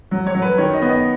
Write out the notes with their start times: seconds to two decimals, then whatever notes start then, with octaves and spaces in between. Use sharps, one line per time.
0.11 F#3
0.27 C#5
0.35 F#3
0.42 B4
0.58 D#3 C#5
0.73 D#5
0.82 B3
0.89 D#5